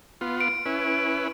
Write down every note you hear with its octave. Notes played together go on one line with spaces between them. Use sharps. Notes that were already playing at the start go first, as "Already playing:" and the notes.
B3 F4
D7
C#4 E4 B4